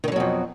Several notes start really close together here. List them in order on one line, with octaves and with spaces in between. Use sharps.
D#3 D3 F#3 B2 F2